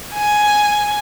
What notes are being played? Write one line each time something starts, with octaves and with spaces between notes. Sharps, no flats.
G#5